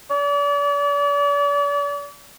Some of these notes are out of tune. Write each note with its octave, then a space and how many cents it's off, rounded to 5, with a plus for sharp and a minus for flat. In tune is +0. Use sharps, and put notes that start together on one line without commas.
D5 -40